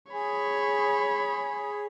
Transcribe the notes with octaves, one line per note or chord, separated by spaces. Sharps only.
G#4 C#5 B5